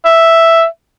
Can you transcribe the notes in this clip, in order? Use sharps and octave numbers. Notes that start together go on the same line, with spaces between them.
E5